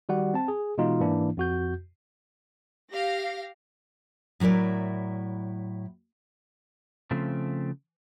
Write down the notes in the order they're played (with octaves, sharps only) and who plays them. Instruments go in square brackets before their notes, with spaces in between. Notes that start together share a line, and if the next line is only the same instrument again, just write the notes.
[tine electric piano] D#3 G3 F#4 F#5
C4 A5
G#4
B2 E3 G#3 D#4 F4
G#2 E3 A#3 D4 E4
F2 F#4 G6
[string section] G4 F5 A#6
[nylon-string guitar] A2 F#3 E4 A#4 D5
[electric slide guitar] C#3 F3 A3 C4